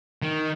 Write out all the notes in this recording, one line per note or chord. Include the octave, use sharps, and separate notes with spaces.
D#3